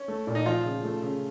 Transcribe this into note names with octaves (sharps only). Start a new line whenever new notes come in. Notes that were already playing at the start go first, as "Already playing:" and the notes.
Already playing: C#4
A3
A#2
D#4
F3 F4
C#3
A3
C#3